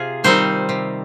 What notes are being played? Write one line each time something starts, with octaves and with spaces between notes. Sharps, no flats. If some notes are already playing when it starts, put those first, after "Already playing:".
Already playing: C3 F4 G#4
D#3 G3 C4 D#4 C5
C3